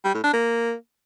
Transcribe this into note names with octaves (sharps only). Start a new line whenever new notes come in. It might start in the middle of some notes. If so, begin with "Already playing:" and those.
G3
A2
D4
A#3